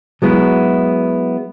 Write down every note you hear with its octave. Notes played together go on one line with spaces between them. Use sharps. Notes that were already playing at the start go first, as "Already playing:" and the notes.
F#3 G#3 B3 E4